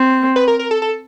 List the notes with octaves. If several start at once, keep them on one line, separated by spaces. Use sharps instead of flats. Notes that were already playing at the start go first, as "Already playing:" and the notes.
Already playing: C4
B4
A#4
A#4
A4
A4